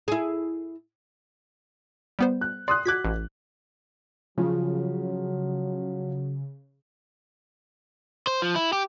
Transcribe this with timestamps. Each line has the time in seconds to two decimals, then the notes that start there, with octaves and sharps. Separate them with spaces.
0.08 E4 G#4
2.19 G3 B3 C5
2.41 F#6
2.68 D5 C6 D#6 F#6
2.86 F#4 D6 F#6 G#6 B6
3.05 A1
4.38 C#3 F3 F#3
8.27 C5
8.42 F3
8.56 E4
8.73 G4